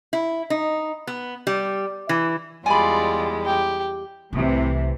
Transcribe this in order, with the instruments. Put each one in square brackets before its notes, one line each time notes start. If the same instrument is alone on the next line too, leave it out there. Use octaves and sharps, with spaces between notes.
[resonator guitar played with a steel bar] E4
D#4
B3
G3
E3
[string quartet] E2 G3 G#3 [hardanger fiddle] F4 D5 [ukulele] G#5 B5
[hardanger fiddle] G4
[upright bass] C2 [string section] A2 C3 E3